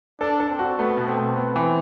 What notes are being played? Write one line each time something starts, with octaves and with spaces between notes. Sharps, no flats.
D4 A4
A4
C4
F#4
A3 B3
B2
C4
A3
B3 C4
E3